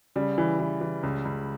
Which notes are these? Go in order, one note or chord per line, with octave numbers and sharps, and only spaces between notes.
C#3 G3
E3
E3
E3
C#2
C#2